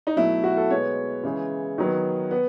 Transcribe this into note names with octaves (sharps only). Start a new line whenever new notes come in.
D#4
B2 F#3 A3 E4
F#4
A4
B2 G#3 B3 C#5
C#3 E3 G#3
D#3 F#3 B3
B3